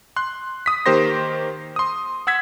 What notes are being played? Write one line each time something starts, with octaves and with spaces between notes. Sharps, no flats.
C6 F#6
D#6 B6
D#3 A#3 G4 C5 C6 A#6
C6 D#6
F#5 E6 G#6 B6